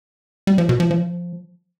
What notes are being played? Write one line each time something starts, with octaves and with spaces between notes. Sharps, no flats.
G3
F3
B2
F3
F3